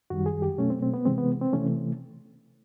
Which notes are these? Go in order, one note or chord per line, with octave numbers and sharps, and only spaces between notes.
F#2 D#3 G3 F#4
G#4
G4
B2 F#3 A3 C#4
C4
C4
B3
C3 E3 G#3 C4
B3
C4
C3 E3 A3 C#4